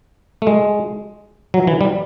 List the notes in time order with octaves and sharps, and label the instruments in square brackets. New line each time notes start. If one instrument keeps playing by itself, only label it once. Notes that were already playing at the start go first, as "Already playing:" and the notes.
[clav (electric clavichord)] A3
G#3
F#3
E3
G3